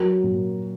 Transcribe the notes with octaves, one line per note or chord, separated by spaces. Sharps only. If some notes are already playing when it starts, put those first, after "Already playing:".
Already playing: F#3 F#4 A#4
A#2